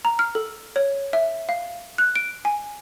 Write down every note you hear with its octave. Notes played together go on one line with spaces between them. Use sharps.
A#5
F6
A4
C#5
E5
F5
F#6
D7
G#5